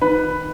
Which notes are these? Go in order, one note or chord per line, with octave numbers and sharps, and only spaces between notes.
D#3 B4